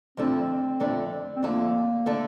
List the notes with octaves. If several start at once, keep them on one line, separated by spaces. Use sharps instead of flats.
F2 D3 A3 C4 D4 A4
F2 D3 A3 D4 A4
C4
F2 D3 A3 A#3 D4 A4
D3 A3 D4 A4